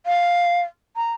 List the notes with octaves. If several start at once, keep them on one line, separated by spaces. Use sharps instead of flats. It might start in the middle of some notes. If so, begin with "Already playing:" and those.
F5
A#5